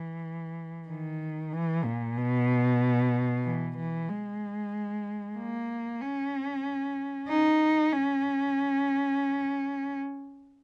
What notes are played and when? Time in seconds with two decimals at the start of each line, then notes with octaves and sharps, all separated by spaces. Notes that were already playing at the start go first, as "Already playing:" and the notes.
Already playing: E3
0.88 D#3
1.53 E3
1.85 A#2
2.17 B2
3.44 E3
3.77 E3
4.09 G#3
5.37 A#3
6.01 C#4
7.29 D#4
7.93 C#4